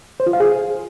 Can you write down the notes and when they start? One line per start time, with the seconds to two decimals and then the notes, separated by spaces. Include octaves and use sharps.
0.20 C5
0.27 F4
0.33 F5
0.40 G#4